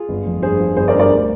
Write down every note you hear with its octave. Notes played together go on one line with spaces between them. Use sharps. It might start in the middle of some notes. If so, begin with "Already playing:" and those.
Already playing: F4 G#4
G1
F2
G2 G#4 C5
F3
G1 G#4 C5
A#4 D5
G2
A#4 D5
D2